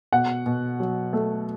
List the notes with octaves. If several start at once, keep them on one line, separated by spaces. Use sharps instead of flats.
B2 F#5
B2
F#3
A3